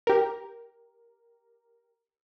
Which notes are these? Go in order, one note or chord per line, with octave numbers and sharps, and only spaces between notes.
G4 A#4